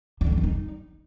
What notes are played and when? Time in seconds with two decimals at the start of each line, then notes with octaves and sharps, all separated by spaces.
0.21 F3
0.26 D3
0.32 F#3
0.38 D#3
0.43 D#4